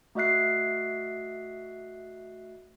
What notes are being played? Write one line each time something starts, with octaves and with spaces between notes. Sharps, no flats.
A3 F#4 D#5 E5 F#6 C7